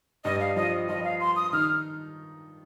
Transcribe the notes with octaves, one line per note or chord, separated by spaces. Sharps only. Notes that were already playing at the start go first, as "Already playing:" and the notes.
G2 G3 D#5
F5
F3 F4 D#5
F3 F4 D#5
F5
C6
D#6
D#3 D#4 F6